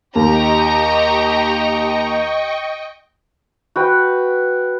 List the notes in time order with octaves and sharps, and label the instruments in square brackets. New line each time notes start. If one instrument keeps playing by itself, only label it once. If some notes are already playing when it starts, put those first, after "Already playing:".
[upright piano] D#2 [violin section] G4 A#5 [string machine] D#5 G5 C#6
[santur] F#4 B4 G5